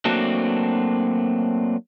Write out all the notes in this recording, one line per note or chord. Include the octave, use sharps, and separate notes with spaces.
F#3 A3 A#3 C4 D4 F#4